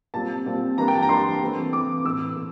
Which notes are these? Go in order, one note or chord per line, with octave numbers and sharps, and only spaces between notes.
A#2 G3 C4 A5
A#2 G3 C4
E3 G3 A#3 D4 A#5
G5
A5
A#5
E3 G3 A#3 D4 C6
C3 E3 A3 C4
C3 E3 A3 C4 D6
A2 E3 A3 E6
A2